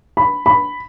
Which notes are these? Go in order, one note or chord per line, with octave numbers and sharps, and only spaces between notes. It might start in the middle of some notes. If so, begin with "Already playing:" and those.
B5
B5